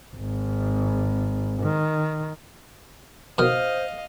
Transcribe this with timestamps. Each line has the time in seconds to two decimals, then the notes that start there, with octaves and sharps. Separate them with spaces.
0.16 G#1
1.62 D#3
3.38 B2 D#3 C5 D#5 F5 D#6 F6